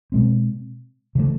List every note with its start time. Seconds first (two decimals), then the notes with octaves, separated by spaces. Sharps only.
0.12 B2 G#3 C4
1.15 C#3 E3 A3